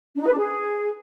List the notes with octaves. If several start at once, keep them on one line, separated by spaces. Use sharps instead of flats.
D4
D#4
B4
D4
G#4